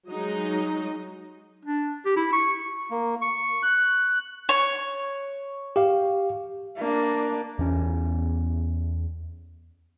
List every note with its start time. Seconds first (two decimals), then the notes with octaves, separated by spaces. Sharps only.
0.10 F#3 G#3 D#4 D#5
1.65 D4
2.05 G4
2.16 E4
2.33 C#6
2.91 A#3
3.22 C#6
3.63 F#6
4.49 C#5
5.76 G4 F5
6.78 A#3 D4
7.59 E2 C#4